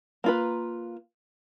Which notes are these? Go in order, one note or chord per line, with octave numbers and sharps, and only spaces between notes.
A#3 F4 B4